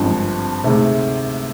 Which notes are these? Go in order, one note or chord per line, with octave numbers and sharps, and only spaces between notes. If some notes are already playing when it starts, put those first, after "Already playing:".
Already playing: G#1 G2 D3 F3 C4
D2 C3 D#3 G#3